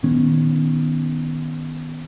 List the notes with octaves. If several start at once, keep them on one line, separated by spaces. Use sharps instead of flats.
A#2 D#3 B3 C#4